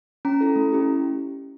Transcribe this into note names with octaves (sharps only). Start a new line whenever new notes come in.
C#4 A#5
E4 A4
A3
C#4 E4 G4